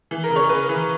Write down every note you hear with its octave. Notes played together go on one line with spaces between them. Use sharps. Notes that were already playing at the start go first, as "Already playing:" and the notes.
E3
A#4
C#3
C#5
C#3 B4
E3